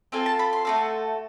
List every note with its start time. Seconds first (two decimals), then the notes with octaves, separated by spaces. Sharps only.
0.12 C4 F4 A4 G#5
0.26 A5
0.39 B5
0.53 C6
0.65 A3 D4 F#4 A4